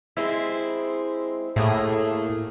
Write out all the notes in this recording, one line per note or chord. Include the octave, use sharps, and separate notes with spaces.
G#3 C4 E4
A2 A3 A#3 G#4